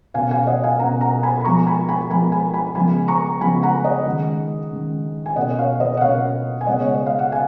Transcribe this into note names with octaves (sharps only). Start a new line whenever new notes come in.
B2 A#3 C#4 F5 G#5
F5 G#5
D#5 F#5
F5 G#5
B2 A#3 C#4 F#5 A#5
F#5 A#5
G#5 B5
B5
F3 G#3 B3 A#5 C#6
G#5 B5
G#5 B5
F3 G#3 B3 G#5 B5
G#5 B5
G#5 B5
C#3 F3 G#3 B3 G#5 B5
A#5 C#6
C#3 F3 G#3 B3 G#5 B5
F#5 A#5
D#5 F#5
D#3 G#3 C#4
D#3 G#3 C#4
G#5
B2 A#3 C#4 D#5 F#5
C#5 F5
B4 D#5
F#5
B2 A#3 C#4 C#5 F5
G#5
C#3 G#3 B3 D#5 F#5
C#5
D#5
F5
F#5
C#3 F5 G#5